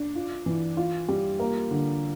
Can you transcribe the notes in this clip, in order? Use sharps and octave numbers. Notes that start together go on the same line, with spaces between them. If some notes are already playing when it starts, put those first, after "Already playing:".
Already playing: D4
F4
E3
F4
G3
A#3
D3